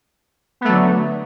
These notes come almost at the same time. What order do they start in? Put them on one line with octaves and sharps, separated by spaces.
B3 A3 F#3 D3